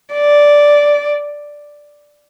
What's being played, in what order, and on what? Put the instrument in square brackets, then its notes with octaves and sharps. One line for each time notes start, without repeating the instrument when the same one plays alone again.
[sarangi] D5